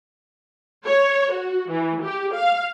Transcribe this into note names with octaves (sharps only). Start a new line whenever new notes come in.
C#5
F#4
E3
G4
F5